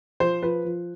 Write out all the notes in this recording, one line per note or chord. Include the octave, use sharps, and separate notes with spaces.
F3 C5
F3 B4
F3